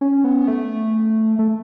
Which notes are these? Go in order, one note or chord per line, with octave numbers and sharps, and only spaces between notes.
C#4
B3
A3
A3